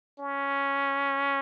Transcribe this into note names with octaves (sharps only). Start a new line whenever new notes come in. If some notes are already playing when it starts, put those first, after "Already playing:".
C#4